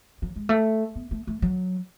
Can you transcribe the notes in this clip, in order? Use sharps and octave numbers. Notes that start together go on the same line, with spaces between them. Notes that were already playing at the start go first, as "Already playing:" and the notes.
F#3
G#3
A3
B3
A3
A3
F#3